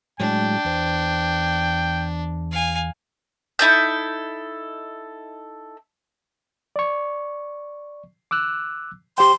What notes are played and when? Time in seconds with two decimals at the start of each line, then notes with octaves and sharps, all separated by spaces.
0.20 A2 F#3 G#3 D4 G5
0.65 E2 C5
2.51 F5 G#5
3.59 D#4 E4 A4 G6
6.76 D5 C#6
8.31 D6 E6 F#6
9.18 G4 C5 G5 C6